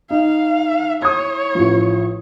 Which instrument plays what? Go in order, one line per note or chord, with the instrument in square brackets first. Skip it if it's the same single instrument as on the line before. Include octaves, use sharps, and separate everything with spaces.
[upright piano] D#4 [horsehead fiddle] F5
[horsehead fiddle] E4 C#5 [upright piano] D#6 G#6
[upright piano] A1 F3